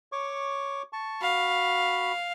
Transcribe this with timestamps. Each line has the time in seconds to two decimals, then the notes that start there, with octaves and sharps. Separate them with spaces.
0.12 C#5 C#6 D6
0.93 A5 C#6
1.21 F#4 F5 B5